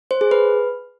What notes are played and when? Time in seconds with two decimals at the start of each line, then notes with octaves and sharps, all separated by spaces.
0.11 C5
0.21 G#4
0.31 B4